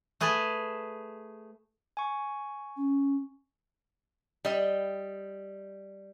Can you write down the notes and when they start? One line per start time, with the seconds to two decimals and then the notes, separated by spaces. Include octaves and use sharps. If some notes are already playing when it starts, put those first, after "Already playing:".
0.21 A3 G#4 B4 G#5 A5
1.97 G#5 C#6
2.77 C#4
4.45 G3 D#5